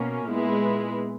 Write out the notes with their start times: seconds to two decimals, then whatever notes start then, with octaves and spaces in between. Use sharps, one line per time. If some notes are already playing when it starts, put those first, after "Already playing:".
Already playing: B2 A#3 C#4
0.27 A#2 G#3 B3 E4 B4